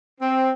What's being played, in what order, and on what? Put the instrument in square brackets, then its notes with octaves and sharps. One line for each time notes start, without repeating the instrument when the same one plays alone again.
[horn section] C4